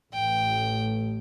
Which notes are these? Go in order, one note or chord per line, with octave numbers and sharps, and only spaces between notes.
A1 G5